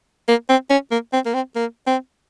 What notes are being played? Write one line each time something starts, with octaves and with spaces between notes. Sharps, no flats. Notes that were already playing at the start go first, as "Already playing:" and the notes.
A#3
C4
C#4
A#3
C4
A#3
C4
A#3
C4